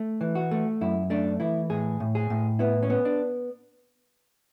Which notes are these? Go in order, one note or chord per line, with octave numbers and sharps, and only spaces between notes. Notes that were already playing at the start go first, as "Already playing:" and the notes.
Already playing: A3
E3
F#4
A3
F#2 E4
A3 D4
E3 E4
A2 G#4
A2
G#4
A2
B3 E4
C#4
B3
D4